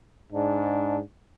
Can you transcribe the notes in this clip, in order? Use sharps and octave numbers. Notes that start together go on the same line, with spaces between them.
G#2 D4